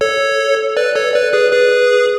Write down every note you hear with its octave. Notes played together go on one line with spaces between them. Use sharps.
A4 C#5
B4 D5
A4 C#5
B4 D5
G#4 B4
G#4 B4